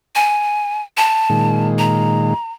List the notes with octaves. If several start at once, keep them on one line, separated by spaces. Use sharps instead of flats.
G#5
A5
A#2 D#3 G#3
A#5